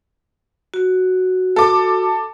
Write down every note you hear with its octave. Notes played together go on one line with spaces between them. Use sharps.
F#4
A4 D6